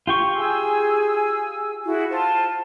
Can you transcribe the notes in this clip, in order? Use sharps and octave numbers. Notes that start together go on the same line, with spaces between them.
F4 G4 C#6
G#4 G#5 E6
E4 F#4 G#4
F4 C5 A5